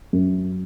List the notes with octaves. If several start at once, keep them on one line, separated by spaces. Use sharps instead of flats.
F#2